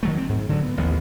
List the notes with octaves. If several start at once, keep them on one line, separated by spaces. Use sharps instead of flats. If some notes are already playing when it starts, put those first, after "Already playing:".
D#3 F#3 A3
C4
G#2
D3 F#3
B3
A1 D#2 B3